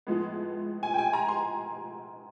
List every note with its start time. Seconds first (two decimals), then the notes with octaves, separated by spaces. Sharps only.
0.07 A2 F3 G#3 B3
0.83 G#5
0.94 G5
0.98 G#5
1.13 A#5
1.28 C6